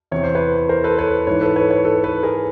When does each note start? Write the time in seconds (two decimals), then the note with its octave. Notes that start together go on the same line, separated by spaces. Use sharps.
0.11 E2 C3 E3 C#5
0.23 C5
0.35 B4 C#5
0.69 A#4 C5
0.84 A4 B4
0.98 B4 C#5
1.27 G#2 E3 B4 C#5
1.41 A4 B4
1.56 B4 C#5
1.70 B4 C#5
1.85 A4 B4
2.03 A4 B4
2.23 G#4 A#4